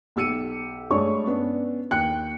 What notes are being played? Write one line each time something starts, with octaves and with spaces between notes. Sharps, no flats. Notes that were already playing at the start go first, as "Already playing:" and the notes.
B1 G4 E6 C#7 D#7
G2 G#3 A3 C#5 D5 C#6
B3 C#4 D4
D#2 G5 F#6 C#7